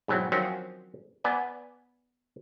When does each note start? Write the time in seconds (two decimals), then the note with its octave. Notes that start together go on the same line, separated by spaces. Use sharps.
0.08 G#2 B2 F#3 C4 E4
0.32 D#3 F3 F#3 C4 C#4
1.24 B3 B4 D5 G#5